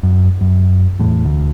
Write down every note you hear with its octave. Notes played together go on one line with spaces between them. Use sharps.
F#2
F#2
E2 A2
D2